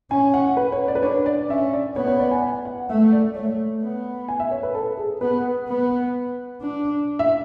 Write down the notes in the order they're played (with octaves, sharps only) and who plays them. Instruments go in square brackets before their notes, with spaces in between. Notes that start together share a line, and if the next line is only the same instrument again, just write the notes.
[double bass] C#4 [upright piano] G#5
[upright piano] F#5
B4
C#5
D5
B4
[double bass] D4 [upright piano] C#5
[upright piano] D5
[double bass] C#4 [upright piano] E5
[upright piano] D5
[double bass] B3 [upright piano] C#5
[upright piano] C#5
D5
G#5
G#5
F#5
[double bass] A3 [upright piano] E5
[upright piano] D5
[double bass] A3 [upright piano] C#5
[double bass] B3
[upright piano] G#5
E5
C#5
B4
A4
G#4
[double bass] B3 [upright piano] B4
[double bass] B3
D4
[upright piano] E5